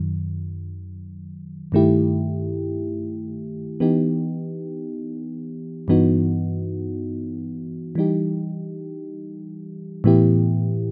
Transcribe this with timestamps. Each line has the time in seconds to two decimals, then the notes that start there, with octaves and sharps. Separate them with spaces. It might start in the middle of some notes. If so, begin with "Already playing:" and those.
Already playing: F#2 D#3 F#3
1.72 G2 D#3 A3 E4 G4
3.80 E3 B3 D#4 G4
5.88 G2 E3 B3 D#4 F#4
7.95 E3 G3 D#4 G4
10.04 A2 E3 B3 E4 G4